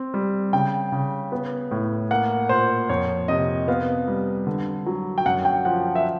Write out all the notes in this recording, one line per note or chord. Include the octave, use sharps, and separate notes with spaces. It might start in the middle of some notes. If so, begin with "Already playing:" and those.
Already playing: C4
G3
C#3 G5
C#3
B3
A2
A#3 F#5
A#2 C5
F2 C#5
C3 D#5
B3 F5
G3
D3
F#3
G5
F#2 F#5
G5
F3 F#5
E5